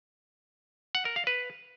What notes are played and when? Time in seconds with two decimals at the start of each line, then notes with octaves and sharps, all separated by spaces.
0.95 F#5
1.05 A#4
1.16 F5
1.27 B4